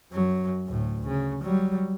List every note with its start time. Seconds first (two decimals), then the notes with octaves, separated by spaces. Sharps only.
0.12 F#2 F#3
0.67 D2 A2
1.07 C#3
1.42 F#3 G3